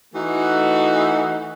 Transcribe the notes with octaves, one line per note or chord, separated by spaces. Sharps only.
E3 A3 D#4 F#4